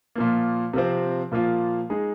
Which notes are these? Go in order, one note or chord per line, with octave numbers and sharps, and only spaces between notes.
A#2 F3 A#3
C3 F3 C4
A#2 F3 A#3 F4
G#3 D#4 G#4